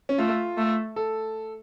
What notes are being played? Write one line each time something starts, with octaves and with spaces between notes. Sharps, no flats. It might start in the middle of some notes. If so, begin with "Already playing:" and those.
C#4
A3 F4
A3
A4